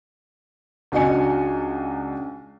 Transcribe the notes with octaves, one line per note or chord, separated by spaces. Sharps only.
C#2 D4 F#4 D#5 G#5 C#7